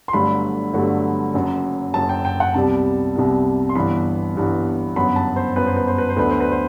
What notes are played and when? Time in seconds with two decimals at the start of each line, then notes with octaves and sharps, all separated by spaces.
0.08 C6
0.13 G1 G2 D3 F#3 A3 B5
0.73 G1 G2 D3 F#3 A3
1.34 F#1 F#2 F#3
1.94 F#1 F#2 F#3 A5
2.09 G5
2.25 G5
2.40 F#5
2.54 C2 C3 G3 B3 A5
3.15 C2 C3 G3 B3
3.69 C6
3.75 G1 G2 E3 B3 B5
4.35 G1 G2 E3 B3
4.96 G1 F#2 F#3 B3 B5
5.16 A5
5.36 C5
5.56 G1 F#2 F#3 B3 B4
5.67 C5
5.77 B4
5.87 C5
5.98 B4
6.09 C5
6.16 D2 D3 F#3 B3 B4
6.30 C5
6.40 B4
6.51 C5